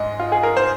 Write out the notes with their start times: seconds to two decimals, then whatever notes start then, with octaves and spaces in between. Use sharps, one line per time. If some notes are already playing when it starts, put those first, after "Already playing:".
Already playing: G#2 G#3 D#5
0.20 F4
0.32 G#4
0.43 A#4
0.57 C5